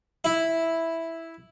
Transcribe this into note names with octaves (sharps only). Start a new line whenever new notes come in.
E4